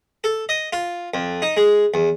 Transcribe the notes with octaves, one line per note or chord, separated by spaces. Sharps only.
A4
D#5
F4
F2
D#4
G#3
E2